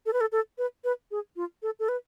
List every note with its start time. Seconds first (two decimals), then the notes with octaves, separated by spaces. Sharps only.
0.06 A4
0.13 B4
0.21 A4
0.32 A4
0.58 B4
0.84 B4
1.11 G#4
1.36 F4
1.63 A4
1.80 A4
1.89 B4